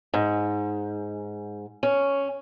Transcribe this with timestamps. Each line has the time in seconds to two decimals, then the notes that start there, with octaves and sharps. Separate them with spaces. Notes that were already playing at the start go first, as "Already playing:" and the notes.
0.14 G#2
1.83 C#4